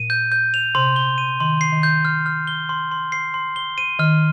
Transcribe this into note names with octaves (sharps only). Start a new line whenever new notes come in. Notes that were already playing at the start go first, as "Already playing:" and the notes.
Already playing: A#2 D#7
G6
G6
F7
C3 C6
G7
D#7
D#3 C6
C7
D#3
G6
F6
F6
G7
C6
C6
C7
C6
G7
D#7
D#3 F6